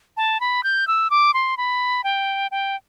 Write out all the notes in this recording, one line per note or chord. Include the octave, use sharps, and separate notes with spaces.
A5
B5
G6
E6
D6
C6
B5
G5
G5